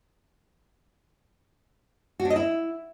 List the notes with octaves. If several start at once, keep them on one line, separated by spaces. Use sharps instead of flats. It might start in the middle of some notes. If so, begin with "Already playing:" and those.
F#4
D4
D#5
E4